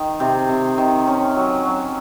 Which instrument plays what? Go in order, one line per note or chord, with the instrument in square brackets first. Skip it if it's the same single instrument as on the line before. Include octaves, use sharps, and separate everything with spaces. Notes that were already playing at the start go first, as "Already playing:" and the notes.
Already playing: [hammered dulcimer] D#3
C3
C3
D#3
C#4
F#3
F#3